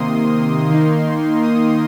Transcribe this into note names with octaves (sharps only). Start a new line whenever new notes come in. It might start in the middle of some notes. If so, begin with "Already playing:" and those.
Already playing: C3 D#3 A#3 C6 D#6
D#3 A#3 D#4
D#6